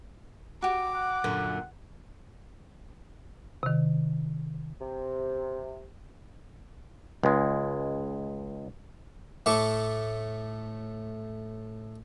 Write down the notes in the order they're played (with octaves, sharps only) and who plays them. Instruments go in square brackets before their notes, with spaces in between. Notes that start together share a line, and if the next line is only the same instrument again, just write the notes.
[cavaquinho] F#4 G4 [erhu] D6
[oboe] F#5
[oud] F#2 A#2 D3
[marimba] C3 D#3
[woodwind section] C3
[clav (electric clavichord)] C#2 G#3
[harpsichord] A2 A3 A5 C#6 D6